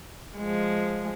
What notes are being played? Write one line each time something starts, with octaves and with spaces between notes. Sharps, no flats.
F3 G#3